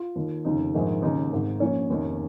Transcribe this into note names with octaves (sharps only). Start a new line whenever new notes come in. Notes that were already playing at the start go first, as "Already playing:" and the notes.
Already playing: F4
D#2 D#3
F1 D#2 C#3 D#4
A#1 G#2 D#3
D#2 C#3 D#4
G#1 G#2 D#3
A#1 A#2 C#4
F1 D#2 D#3